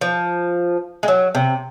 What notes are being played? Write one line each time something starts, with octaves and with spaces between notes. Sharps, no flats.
F3
G#3
F#3
C3